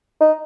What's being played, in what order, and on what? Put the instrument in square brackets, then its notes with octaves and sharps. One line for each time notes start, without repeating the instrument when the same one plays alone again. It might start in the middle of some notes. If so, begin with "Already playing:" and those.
[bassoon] D#4